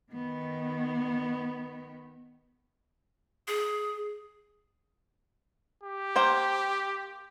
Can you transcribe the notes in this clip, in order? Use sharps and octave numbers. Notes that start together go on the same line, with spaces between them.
D#3 B3
G#4
G4
A#3 C5 G5